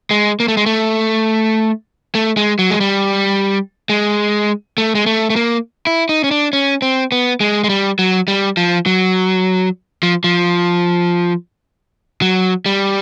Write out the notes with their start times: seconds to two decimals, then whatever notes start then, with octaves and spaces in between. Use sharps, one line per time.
0.11 G#3
0.40 A#3
0.48 A3
0.57 G#3
0.66 A3
2.15 A3
2.37 G#3
2.59 F#3
2.70 G#3
2.80 G3
3.90 G#3
4.78 A3
4.95 G#3
5.06 A3
5.30 A3
5.36 A#3
5.87 E4
6.09 D#4
6.24 C#4
6.31 D4
6.53 C#4
6.82 C4
7.12 B3
7.40 G#3
7.64 G#3
7.69 G3
7.99 F#3
8.28 G3
8.57 F3
8.86 F#3
10.03 F3
10.24 F3
12.22 F#3
12.66 G3